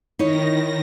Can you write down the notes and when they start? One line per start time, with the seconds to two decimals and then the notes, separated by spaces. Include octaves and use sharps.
0.19 D#3 D#4 E4 C#5 A#6